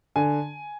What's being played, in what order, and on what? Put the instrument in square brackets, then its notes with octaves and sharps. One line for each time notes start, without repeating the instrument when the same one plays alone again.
[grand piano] D3 G#5